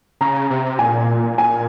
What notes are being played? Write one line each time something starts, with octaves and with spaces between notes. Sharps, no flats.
C#3 A#5
C3
A#2 G#5
G#5